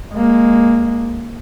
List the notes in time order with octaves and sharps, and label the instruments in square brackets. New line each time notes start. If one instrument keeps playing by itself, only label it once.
[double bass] G#3 A#3